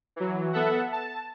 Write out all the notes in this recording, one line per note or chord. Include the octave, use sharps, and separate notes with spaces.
E3 F#3
B3 A4 E5 F#5
A5